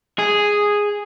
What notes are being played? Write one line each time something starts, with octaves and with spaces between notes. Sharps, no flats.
G#4